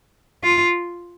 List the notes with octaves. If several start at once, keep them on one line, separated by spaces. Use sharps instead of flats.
F4